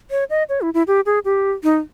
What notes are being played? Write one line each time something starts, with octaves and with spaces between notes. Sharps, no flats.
C#5
D#5
C#5
E4
E4
G4
G#4
G4
D#4